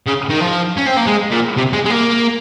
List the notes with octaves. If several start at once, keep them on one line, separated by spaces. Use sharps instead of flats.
C#3
D#3
F3
C#4
C4
A#3
G#3
A#2
C3
G#3
G#3
A#3